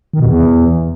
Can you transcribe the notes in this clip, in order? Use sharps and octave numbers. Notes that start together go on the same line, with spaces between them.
D#3
B2
E2